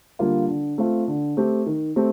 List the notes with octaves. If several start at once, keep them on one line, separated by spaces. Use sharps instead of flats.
D3 G3 A#3 F4
D3
A3 C4 F4
D3
A3 C4 G4
D#3
A3 C4 G4